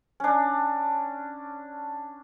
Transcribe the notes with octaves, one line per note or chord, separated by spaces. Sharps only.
C#4 D4